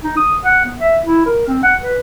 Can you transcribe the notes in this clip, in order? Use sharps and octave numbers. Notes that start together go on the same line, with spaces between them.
D#4
D#6
F#5
B3
E5
E4
A#4
C4
F#5
B4